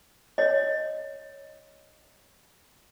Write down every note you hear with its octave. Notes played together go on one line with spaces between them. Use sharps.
C#5 D#5